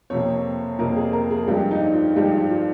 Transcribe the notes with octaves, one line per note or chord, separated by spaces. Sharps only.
F2 C3 F3 A#3 C#5
F2 C3 F3 A#3 A#4
G#4
A#4
G#4
G2 F3 G#3 G4
D#4
F4
G2 F3 G#3 G4
F4
F4